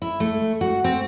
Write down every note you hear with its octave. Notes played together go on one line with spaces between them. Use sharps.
E4
A3
F#4
C4